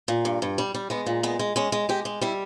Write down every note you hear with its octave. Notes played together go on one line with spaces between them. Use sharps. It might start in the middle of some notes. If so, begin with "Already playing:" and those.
A#2
G2
G2
G3
G3
G#3 B3
A#2
G#3 B3
G#3
G#3 C#4
G#3
G#3 G4
G#3
G3 E4